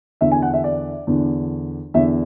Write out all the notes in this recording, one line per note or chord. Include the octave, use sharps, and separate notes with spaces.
E2 D3 E5
G#5
F#5
E5
D5
E2 D3
E2 D3 E5